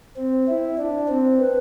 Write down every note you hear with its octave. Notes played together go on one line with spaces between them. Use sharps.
C4
E4
D4
C4
B4